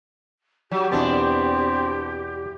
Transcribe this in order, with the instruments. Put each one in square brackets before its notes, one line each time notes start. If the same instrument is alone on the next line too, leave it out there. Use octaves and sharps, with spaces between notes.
[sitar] F#3 [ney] G4
[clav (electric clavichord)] E2 B2 A5 [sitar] B3 D4 [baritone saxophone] C4